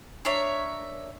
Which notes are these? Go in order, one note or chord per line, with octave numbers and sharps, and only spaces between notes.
D4 A#4 C#5 E5